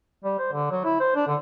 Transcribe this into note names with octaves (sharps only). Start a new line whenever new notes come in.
G3
C5
D3
F#3
E4
C5
D4
D3